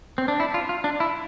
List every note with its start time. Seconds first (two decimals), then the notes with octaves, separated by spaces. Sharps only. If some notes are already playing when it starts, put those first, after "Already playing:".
0.18 C4
0.28 D4
0.40 E4
0.54 F4
0.69 F4
0.84 D4
1.00 E4